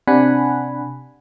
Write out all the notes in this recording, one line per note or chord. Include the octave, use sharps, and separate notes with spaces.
C3 D4 F#5 G#5 B5